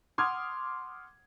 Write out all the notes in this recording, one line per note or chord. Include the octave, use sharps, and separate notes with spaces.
F#5 C6 D6 D#6 F6 G#6